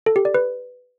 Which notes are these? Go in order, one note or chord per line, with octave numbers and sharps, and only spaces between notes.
A4
G4
D5
B4